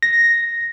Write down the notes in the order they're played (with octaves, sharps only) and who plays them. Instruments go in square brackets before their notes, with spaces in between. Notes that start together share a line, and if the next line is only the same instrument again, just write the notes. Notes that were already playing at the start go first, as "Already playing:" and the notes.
[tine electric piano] A#6